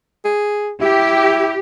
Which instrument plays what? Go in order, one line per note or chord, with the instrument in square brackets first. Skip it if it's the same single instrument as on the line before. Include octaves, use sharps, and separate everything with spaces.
[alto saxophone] G#4
[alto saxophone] E4 [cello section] G4